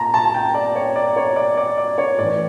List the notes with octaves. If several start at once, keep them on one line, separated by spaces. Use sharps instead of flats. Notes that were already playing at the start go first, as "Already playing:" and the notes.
Already playing: A#2 A5 A#5
A5
A5
G5
D5
C#5
D5
C#5
D5
D5
D5
C#5
A2 E3 D5